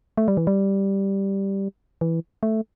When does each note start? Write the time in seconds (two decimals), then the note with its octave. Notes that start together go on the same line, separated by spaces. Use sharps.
0.18 A3
0.28 G3
0.37 E3
0.47 G3
2.01 E3
2.43 A3